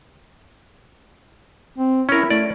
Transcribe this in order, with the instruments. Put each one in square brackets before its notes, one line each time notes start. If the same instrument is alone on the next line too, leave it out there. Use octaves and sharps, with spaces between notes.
[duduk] C4
[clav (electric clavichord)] C#4 A#4 [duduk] E4
[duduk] A3 [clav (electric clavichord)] D5